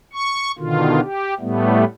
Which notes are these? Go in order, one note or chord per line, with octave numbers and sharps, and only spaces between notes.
C#6
B2 D3 D#3 F4
G4
A2 G3 A3 B3